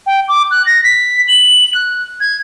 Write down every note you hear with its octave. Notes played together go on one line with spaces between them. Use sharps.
G5
D6
F#6
A#6
B6
F#7
F#6
G#6